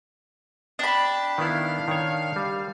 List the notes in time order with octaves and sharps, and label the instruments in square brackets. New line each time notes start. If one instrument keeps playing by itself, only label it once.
[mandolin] D4 B5 [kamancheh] G5 A5
[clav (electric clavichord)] D#3 B3 E4 [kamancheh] F5
[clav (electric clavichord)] D#3 C#5
G3